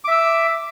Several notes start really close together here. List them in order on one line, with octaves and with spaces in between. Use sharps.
D6 E5 E6